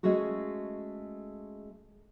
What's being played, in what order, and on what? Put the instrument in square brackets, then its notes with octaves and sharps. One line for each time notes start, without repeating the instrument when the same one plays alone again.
[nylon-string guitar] G#3 A3 C#4 F#4 G#4